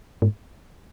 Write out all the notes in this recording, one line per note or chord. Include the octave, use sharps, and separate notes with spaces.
G#2